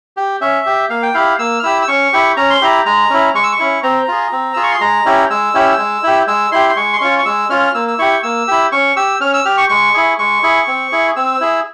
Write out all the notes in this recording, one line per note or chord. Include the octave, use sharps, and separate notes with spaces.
G4
C#4 E5
G4
A#3 F5
G5
E4 G4 F5
A#3 E6
F6
E4 G4 E6
E6
C#4 C#6
E4 G4
C#4 A#5
C6
E4 G4 A#5
G#3 A#5
C#4 E4
G#3 C#6
E6
C#6
C#4 E4
C4 A#5
F4 G#4
C4
F4 G#4 E6
C#6
C6
G#3 A#5
C#4 E4 G4
G#3 E6
C#4 E4 G4
G#3
E4 G4
G#3 E6
E4 G4 C6
C6
G#3 C#6
C6
C#4 F4 C#6
C#6
G#3 E6
C#4 F4 F6
A#3 E6
E6
E4 G4 C#6
A#3 E6
E4 G4
C#4 C#6
G4 E6
C#4 F6
E6
G4 F6
C#6
G#3 C#6
E4 G#4
G#3 C#6
E4 G#4
C4
E4 G#4
C4 E6
E4 G#4